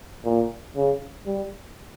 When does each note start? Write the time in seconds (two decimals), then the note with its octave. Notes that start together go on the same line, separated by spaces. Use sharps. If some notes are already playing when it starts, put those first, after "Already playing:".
0.25 A#2
0.76 C#3
1.26 G3